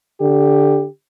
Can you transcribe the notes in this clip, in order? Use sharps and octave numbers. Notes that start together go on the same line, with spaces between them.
D3 G4